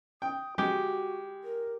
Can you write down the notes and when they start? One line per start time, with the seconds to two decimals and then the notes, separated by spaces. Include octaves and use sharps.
0.22 G5 D#6
0.58 G#3 F#4 G4
1.44 A#4